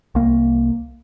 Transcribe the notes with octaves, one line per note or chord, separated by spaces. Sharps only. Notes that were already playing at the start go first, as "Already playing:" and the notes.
C2 A#3